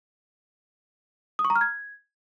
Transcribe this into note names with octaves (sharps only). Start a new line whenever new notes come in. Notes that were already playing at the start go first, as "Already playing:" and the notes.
D#6
C#6
A#5
F6
G#6